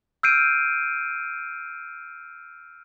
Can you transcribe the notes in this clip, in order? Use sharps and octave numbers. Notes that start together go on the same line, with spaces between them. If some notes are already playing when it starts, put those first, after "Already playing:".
E6 F6 G6 C7 D7 D#7